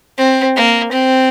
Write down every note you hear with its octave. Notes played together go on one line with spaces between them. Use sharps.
C4
A#3
C4